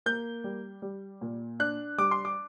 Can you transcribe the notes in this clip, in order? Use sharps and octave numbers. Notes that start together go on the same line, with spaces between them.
A#3 G6
G3
G3
A#2
D4 F#6
G3 D6
C6
D6